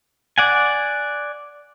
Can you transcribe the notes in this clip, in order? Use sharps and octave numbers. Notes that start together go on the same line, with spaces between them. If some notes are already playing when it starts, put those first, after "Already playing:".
D5 F#5 G#5